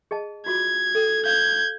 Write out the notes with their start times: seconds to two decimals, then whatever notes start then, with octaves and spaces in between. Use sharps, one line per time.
0.11 G#4 D#5 A5
0.46 F4 F#4 D6 G#6
0.95 A4
1.26 F5 G6 G#6